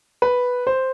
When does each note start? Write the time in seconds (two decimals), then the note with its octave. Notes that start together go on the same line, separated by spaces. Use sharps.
0.22 B4
0.67 C5